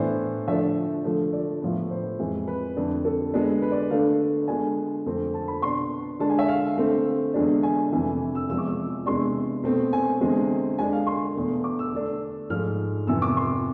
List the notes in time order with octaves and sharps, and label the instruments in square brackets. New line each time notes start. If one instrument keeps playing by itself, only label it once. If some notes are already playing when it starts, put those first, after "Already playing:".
Already playing: [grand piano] A2 E3 B3 D4 C5
D3 F3 A3 D4 E5
D3 F3 A3
D5
A2 F3 B3
C5
F2 E3 G#3
B4
F2 D3 A3 D4
A4
D3 G#3 B3 D4
B4
D5
D3 A3 D4 F5
D3 G#3 B3 D4 G#5
F2 D3 A3 C4
A5
B5
B2 B3 D4 C6
D3 G#3 D4 A5
G#5
E5
F5
D3 A3 C4
E2 D3 G#3 D4
G#5
F2 C3 E3 A3
E6
E2 C3 F3 G#3 E6
D6
E6
E2 C3 G#3 B3 D4 C6
B2 A3 C4
G#5
E2 D3 G#3 C4
D3 G#3 D4 G#5
F5
C6
E2 B2 A3
D6
E6
D3 A3 D4
G#2 F3 A3 F6
F2 C3 E3 B3 E6
D6
C6